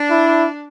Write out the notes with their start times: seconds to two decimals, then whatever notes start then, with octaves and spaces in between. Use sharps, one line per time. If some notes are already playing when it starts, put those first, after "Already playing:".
Already playing: D4
0.10 E4